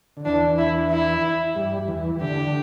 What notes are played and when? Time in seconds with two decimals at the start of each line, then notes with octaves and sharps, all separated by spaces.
0.17 D3
0.25 E2 E3 D4
0.58 E4
0.91 E4
1.55 G2 G3
1.88 E2 E3
2.21 D2 D3 G4